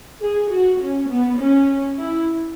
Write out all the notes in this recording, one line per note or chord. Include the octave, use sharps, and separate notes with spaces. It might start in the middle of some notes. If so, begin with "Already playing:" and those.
G#4
F#4
C#4
B3
C#4
E4